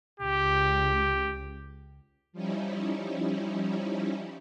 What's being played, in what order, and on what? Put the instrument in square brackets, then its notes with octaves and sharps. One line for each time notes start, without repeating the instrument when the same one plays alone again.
[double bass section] C#2 [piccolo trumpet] G4
[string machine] F3 G3 C#4 D#4 E4